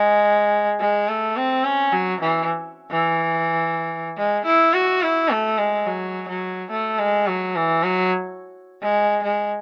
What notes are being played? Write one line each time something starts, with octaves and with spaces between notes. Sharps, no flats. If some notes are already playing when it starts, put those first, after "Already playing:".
Already playing: G#3
G#3
A3
C4
C#4
F#3
E3
E3
G#3
E4
F#4
E4
A3
G#3
F#3
F#3
A3
G#3
F#3
E3
F#3
G#3
G#3